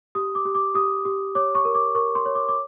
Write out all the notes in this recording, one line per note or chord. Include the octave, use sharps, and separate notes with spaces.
G4 D#6
D6
G4
D6
G4 D#6
G4
C#5 D6
C#6
A#4
D6
A#4 C#6
C6
C#5
D6
D6